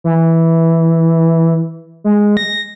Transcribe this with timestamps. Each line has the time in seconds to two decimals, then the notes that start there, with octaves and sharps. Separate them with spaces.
0.04 E3
2.04 G#3
2.37 A#6